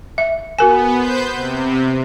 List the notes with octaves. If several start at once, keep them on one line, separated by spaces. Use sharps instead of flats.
E5
B3 F#4 A#4 G#5
B4 C5 G6
C3